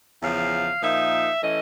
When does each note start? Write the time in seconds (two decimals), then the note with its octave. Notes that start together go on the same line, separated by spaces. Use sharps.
0.21 E2 C#3 F3 F5
0.82 A#2 F3 A#3 D#4 E5
1.43 E3 A3 C#4 D#5